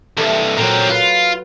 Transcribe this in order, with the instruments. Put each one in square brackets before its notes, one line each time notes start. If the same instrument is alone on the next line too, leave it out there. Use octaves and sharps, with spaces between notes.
[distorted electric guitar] C2 G2 [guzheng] A4 E5 A5
[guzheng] A#2 F#3 [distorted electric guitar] C4 A#4
[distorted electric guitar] F4 [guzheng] B4